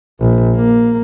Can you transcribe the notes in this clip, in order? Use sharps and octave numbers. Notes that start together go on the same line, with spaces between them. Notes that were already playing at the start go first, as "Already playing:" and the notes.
A#1
A#3